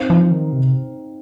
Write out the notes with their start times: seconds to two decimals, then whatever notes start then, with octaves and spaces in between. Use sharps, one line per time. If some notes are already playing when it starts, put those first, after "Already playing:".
Already playing: C4 D#4 C5 F5
0.10 F3
0.31 D#3
0.53 C3